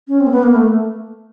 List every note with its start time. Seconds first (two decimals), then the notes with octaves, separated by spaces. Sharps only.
0.08 C#4
0.20 C4
0.27 A#3
0.31 B3
0.43 A#3
0.55 A3